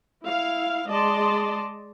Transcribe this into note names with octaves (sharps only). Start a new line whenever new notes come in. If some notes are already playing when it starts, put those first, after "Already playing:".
E4 F5
G#3 D5 D#5 A5 C6